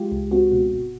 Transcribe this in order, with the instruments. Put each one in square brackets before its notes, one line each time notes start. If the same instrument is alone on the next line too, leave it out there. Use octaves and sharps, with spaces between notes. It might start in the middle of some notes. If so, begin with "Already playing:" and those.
Already playing: [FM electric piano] G#3 F4 G4
C#2
C4 F#4
B2
G1